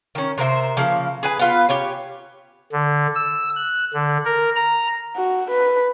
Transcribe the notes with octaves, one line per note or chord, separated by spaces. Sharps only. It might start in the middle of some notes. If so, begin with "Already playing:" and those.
D#3 C#4
C3 A#4 C5 E5
C#3 F3 A#3
G#4 B4 G#5
B3 F4 B4
G4 C#5 G#5
D3
E6
F#6
D3
A#4
A#5
F#4
B4